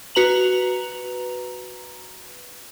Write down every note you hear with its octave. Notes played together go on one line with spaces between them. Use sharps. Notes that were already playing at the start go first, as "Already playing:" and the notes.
F#4 B4 A#5 F7 F#7